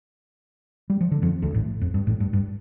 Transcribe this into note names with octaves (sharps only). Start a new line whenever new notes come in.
G3
F3
D3
F2 F3
D2 D3
A1 A2
F2
G2
A1 A2
G2
G2